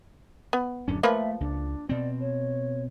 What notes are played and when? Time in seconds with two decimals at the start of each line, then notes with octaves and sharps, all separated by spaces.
0.53 B3
0.88 D1 F#2 C#4 D4
1.03 F3 A3 A#3 B4 E5
1.40 C#2 D4
1.89 B2 C4 D5
2.20 C#5